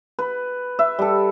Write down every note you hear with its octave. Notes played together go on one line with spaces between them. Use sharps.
B4
E5
G3 A4